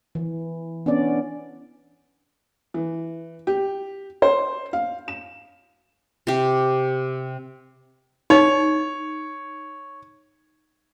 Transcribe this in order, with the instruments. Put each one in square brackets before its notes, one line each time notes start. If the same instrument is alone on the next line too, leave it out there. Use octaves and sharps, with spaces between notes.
[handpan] E3
B3 C#4 D4 D5
[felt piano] E3
G4
C5
F5
E7
[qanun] C3 G4
[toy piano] D#4 [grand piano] C#5